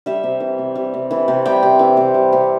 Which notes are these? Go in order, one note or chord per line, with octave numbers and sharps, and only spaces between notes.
G3 E5
C3
E3
C3
G3
C3
E3
C3
G3 G5
C3
E3
C3
G3
C3